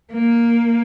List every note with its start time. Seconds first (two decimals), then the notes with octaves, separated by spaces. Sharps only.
0.12 A#3